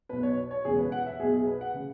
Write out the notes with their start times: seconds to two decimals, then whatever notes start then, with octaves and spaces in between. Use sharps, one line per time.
0.09 B1 B2 B4
0.23 C#5
0.51 C#5
0.65 E1 E2 C#3 E3 G#4
0.79 B4
0.92 F#5
1.06 E5
1.19 B1 B2 G#4
1.33 G#4
1.47 B4
1.61 F#5
1.74 C#3